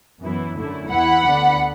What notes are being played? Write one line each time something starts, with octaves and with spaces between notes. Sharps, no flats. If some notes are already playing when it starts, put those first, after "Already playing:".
F#2 E3 B3 E4
F#2 D3 A3 E4
E2 E3 B3 E4 F#5 B5
D2 D3 B3 D4